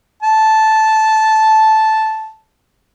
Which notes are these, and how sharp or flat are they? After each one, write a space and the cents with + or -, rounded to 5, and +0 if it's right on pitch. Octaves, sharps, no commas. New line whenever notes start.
A5 -10